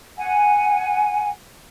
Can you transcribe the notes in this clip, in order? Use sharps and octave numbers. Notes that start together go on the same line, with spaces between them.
F#5 G#5